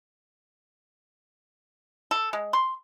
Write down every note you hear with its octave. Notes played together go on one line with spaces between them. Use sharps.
A4
G#3
C6